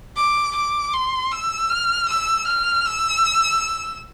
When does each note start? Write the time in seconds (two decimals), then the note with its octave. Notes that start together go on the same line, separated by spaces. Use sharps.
0.16 D6
0.55 D6
0.93 C6
1.31 E6
1.70 F6
2.08 E6
2.47 F6
2.86 E6